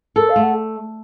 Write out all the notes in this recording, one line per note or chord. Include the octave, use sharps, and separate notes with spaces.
A4 A#4
F5
A3
F#5